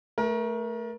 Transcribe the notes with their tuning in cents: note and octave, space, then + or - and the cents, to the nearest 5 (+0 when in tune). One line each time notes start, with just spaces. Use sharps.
A3 +0 A#4 +30